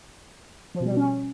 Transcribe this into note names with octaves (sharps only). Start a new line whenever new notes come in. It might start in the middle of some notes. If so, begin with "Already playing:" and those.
F3
B2
G3
B2
C#4